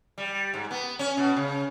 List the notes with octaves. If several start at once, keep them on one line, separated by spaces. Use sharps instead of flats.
G3
G#2
B3
C#4
B2
C#3